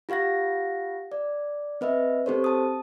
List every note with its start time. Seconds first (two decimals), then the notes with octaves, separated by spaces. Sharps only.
0.09 F4 G4 F5 F#5 A#6
1.12 D5
1.81 C4 B4 D#5 E5
2.26 C4 G4 A4 C5 C#5
2.44 A5 D#6